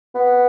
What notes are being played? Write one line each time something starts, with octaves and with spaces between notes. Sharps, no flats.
B3